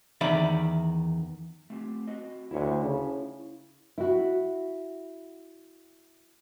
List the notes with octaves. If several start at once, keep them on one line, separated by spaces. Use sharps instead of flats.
E2 D#3 D5 E5 B5
A3 C4 G4
C4 F#4 D#5
D2 E4 C#5
C#3
E4 F#4